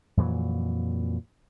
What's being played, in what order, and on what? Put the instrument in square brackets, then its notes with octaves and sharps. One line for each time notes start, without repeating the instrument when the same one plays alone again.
[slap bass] F2 A#2 E3 F#3